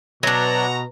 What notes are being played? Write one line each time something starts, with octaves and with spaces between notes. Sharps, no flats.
B2 F#3 D4 F#4 B4 F#5 A#5